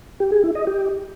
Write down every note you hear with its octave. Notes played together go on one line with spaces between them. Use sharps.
G4
G#4
E4
D#5
G4